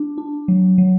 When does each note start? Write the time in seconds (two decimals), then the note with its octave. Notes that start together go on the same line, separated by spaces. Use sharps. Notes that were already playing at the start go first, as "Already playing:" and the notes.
Already playing: D4
0.18 D4
0.48 F#3
0.78 F#3